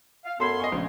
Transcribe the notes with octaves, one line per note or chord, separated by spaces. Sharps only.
F5
F#2 B3 A4 B5 C6 G#6
D#5 G#5 C#6
A#1 C#3